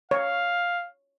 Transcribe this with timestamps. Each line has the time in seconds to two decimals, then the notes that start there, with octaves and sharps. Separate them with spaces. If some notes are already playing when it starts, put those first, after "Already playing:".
0.11 C#5 F5